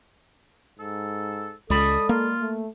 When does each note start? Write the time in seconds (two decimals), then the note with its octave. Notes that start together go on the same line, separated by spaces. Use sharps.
0.79 G#2 A4
1.70 C#2 G#3 A4 D5 B5 D#6
2.09 A#3 F4
2.41 A3